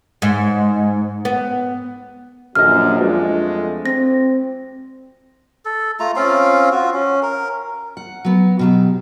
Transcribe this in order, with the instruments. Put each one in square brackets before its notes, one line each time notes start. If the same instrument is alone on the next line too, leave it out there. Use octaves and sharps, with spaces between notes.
[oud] G#2
B3
[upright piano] D#1 D#5 [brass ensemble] A#1 F#2 [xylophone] F6
[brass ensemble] F2 G#3 A3 [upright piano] F3 F#3 D4
[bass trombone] C4 [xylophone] A#6
[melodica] A4
A3 F4 A#5
C4 C#4 F4 F5
F4 F#4
C#4
A#4
[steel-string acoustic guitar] F#5
F#3 B3
B2 F#3 G4